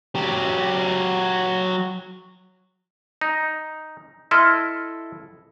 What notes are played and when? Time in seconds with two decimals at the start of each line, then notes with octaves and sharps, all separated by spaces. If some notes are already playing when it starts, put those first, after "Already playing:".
0.15 F#3 G4
3.21 D#4
4.31 E4 A4 D#5 C6 F6